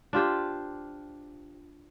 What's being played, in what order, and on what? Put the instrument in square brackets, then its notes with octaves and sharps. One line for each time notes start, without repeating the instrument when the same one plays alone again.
[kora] D4 F4 G4 C5